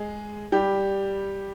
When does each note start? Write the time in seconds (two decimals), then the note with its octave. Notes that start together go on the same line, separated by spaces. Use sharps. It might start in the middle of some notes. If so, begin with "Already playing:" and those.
Already playing: G#3 G#4
0.52 G3 G4